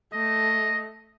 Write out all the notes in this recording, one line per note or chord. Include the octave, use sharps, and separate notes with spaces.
A3 D#5